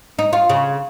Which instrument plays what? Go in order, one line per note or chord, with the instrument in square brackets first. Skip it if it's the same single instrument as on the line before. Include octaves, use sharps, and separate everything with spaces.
[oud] D#4
F4
C#3